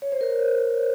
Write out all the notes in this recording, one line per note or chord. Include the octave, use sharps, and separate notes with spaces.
C#5
C5
A#4